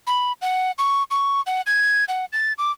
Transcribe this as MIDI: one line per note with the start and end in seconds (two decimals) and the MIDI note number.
0.07 0.32 83
0.42 0.71 78
0.78 1.03 85
1.11 1.41 85
1.46 1.61 78
1.66 2.04 92
2.08 2.25 78
2.33 2.53 93
2.58 2.71 86